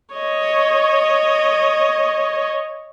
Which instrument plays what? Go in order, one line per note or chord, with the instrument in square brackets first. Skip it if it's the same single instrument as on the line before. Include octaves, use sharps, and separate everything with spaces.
[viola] C#5 D#5